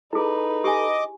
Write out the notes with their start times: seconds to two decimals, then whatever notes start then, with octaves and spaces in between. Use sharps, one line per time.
0.13 D#4 E4 G#4 A4 B4
0.64 G4 D#5 G#5 D6